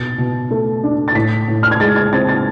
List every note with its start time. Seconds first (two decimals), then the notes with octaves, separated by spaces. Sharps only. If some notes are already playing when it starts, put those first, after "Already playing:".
Already playing: B2 A6
0.18 B2
0.51 A3
0.83 D4
1.08 A6
1.15 A2 B6
1.48 A2
1.63 F6
1.71 G#6
1.80 G#3 A6
1.96 G#6
2.12 C4 A6
2.29 A6